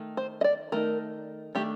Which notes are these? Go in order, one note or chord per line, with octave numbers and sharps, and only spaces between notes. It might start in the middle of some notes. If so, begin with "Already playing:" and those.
Already playing: D#3 A3 D#4
C5
D#5
D5
D#3 A3 D#4 A#4
D#3 A3 D4 G4